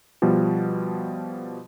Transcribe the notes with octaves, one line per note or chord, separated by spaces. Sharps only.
B2 F3 G3